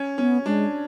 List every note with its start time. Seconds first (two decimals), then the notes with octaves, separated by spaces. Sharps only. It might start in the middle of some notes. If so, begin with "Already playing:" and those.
Already playing: C#4
0.18 B3 C#4
0.46 G#3 D4